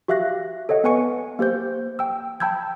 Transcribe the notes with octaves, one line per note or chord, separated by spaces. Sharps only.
F#4 G4 E5 F5 F#6 A#6
A4 C#5 D#5 F#5
B3 B4 F#5 G#5 C#6 C#7
A#3 G4 C5 G6
G5 E6
G5 A5 B5 E6 G6 G#6